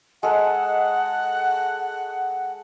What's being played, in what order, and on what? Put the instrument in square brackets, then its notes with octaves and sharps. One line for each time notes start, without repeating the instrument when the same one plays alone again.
[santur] G#3 A4 [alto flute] F#5